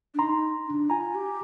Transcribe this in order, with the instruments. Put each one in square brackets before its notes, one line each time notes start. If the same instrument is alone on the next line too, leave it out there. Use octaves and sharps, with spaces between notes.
[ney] D4
[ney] D#4 [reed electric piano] A#5 C6
[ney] D4
[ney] F4 [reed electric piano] G#5 A#5
[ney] G4